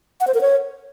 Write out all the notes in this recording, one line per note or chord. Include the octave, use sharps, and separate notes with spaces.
F#5
C5
A#4
C#5